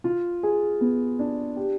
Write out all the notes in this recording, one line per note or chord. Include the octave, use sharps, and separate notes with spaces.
F4
G#4
B3
D4
G4